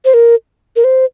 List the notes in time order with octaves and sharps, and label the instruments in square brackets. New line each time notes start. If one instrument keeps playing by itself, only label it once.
[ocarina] C5
A#4
A#4
C5